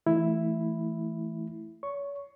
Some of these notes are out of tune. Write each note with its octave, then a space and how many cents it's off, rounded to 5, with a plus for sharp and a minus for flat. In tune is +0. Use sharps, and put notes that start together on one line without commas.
E3 +0 A3 +0 E4 +0
C#5 +35 C#6 +0